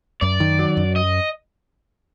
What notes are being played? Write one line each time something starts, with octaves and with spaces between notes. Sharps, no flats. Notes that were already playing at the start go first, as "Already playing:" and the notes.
F#2 D5
D#3
F#3
F#2
D#5